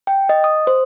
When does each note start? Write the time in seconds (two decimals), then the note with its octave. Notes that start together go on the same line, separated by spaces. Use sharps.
0.07 G5
0.29 D#5
0.44 D#6
0.67 C5